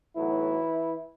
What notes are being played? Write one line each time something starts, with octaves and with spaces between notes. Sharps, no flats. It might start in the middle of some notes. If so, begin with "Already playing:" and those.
B1 A2 E3 F#3 B3 E4